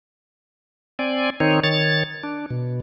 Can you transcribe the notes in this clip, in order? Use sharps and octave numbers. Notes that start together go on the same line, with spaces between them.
C4 D5 G#5
D#3 C4 D#4 C#5
D#3 C#5 A6
D4
B2